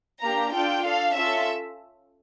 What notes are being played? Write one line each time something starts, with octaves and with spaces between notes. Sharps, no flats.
A#3 D4 G4 A#5
D4 F4 A4 G5
D4 A4 F5
C#4 F4 A4 E5